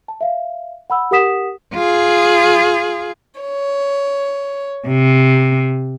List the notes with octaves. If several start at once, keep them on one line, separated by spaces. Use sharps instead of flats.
A5
E5 F5
F#5 B5 E6
G4 A#4 F#5 D#6 B6 E7
F4 G#4
C#5
C3